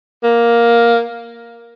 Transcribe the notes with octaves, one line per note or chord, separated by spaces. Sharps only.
A#3